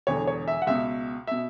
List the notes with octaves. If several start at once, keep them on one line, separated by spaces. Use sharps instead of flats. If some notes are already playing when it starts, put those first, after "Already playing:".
E1 E2 D3 C#5
C#5
E5
F#5
C#2 B2 E5
B2 E5